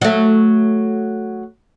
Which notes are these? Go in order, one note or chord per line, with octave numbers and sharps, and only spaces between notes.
F#3 A3